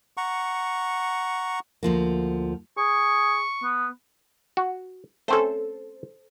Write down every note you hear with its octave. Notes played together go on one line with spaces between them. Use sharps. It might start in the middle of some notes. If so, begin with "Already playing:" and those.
F#5 A#5 C#6
D2 F3 A#3
G#4 C#6
B3
F#4
A3 C4 C#4 A4 C5